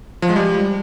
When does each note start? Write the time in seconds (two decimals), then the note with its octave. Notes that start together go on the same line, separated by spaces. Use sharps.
0.22 F3
0.29 G#3
0.36 G3